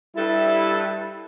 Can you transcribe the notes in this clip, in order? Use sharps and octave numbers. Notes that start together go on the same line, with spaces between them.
G2 G3 E4 A4